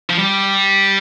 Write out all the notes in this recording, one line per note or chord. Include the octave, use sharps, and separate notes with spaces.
F3
G3